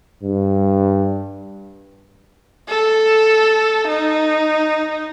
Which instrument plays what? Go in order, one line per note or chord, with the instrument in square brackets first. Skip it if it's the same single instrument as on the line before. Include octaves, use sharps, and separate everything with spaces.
[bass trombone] G2
[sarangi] A4
D#4